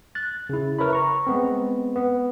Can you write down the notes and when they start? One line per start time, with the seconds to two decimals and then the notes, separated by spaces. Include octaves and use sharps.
0.15 F#6 A6
0.49 C#3 E4
0.79 A#4 B4 C#5 E5 B5
0.93 A#5 C#6
1.27 G#3 B3 C4
1.96 B3